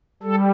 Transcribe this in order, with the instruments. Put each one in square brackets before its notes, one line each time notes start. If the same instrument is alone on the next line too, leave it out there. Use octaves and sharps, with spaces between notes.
[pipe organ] G3 A4